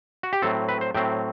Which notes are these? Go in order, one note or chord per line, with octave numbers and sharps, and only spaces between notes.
F#4
G4
A2 F#3 C4 A4
B4
C5
A2 F#3 C4 G5